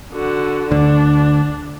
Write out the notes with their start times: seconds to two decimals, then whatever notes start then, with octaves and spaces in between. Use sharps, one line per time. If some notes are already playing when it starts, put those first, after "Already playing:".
0.13 D3 F#4
0.71 D2 D3 D4